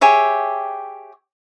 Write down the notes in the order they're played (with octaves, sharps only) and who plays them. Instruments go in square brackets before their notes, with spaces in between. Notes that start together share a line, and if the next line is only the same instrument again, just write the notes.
[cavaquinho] G4 G#4 C#5 E5